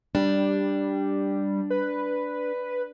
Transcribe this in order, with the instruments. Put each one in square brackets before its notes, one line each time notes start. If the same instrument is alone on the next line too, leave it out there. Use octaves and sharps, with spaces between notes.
[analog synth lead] G3 [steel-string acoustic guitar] D4
[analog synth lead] B4